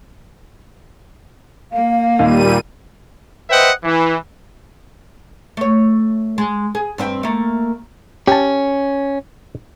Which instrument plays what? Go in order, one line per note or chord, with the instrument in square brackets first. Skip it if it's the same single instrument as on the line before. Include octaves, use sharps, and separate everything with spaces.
[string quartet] A#3 [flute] F5
[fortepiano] D#2 [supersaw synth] A#2 G3 D#7
[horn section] B4 C5 D#5 E5 F#5 G5
E3
[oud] A3 C#5
G#3
G#4
G2 C4 E5
A3 A#3
[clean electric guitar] C#4 [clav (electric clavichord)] G4 A5